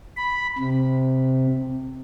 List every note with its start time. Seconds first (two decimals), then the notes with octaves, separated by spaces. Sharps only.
0.17 B5
0.58 C3